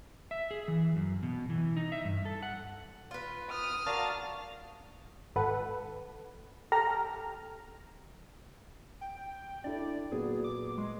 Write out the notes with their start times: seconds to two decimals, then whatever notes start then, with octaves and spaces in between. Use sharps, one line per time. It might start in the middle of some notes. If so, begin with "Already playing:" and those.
0.31 E5
0.51 G#4
0.68 E3
0.96 F#2
1.23 B2
1.50 E3
1.76 D#4
1.92 E5
2.05 G2
2.25 A4
2.43 F#5
3.11 F4 B4
3.50 D#6 F6
3.86 D4 F#4 A#4 F5 A5
5.36 G#1 A4 B4 F#5
6.72 G4 A4 A#5 F6
9.01 G5
9.64 D4 E4 A4 D5
10.12 A#2 F#3 B3 G#4
10.44 D6
10.78 G#3 C6